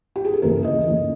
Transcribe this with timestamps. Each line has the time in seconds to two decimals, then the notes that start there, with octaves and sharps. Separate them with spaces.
0.16 G4
0.25 G#4
0.33 A4
0.42 D#2 C#3 E3 A3 A#4
0.64 D#5
0.86 D#2 C#3 E3 A3